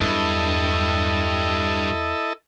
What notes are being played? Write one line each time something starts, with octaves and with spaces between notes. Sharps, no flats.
E2 G2 F#3 E4 A4 D#5